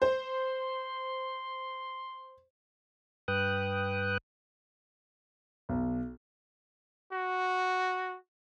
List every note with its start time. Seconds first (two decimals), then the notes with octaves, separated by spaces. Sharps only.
0.02 C5 C6
3.28 G2 B4 G5 D#6 F#6
5.69 B1
7.13 F#4